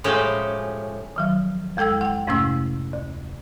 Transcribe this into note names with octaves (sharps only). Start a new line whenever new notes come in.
A2 F3 G#3 C#4 G4
D#3 F3 F#3
F2 G#3 A4 G5 E6
F#5 G5
F2 G#2 C3 A3 C#4 E6
D2